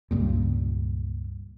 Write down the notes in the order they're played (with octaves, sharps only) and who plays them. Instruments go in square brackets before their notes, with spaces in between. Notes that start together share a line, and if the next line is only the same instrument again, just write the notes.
[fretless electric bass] C#2 G2 A#2